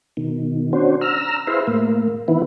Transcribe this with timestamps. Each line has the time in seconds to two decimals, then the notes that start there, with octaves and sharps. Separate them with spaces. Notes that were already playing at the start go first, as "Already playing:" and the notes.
0.17 B2 D#3
0.73 C#4 D4 F#4 C5
1.01 A#5 E6 F6
1.47 E4 G#4 B4 C5 E5 F5
1.67 A2 A#3
2.28 D#3 E3 B3 E4